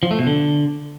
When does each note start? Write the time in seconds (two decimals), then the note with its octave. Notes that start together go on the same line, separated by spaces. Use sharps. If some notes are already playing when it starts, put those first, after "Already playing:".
0.03 F3
0.11 A3
0.19 B2
0.27 D3